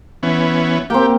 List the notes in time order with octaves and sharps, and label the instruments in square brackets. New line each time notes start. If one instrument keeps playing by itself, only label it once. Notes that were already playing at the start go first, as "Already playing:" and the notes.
[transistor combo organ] E3 B3 C#4
[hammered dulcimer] A#3 C4 [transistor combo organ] G4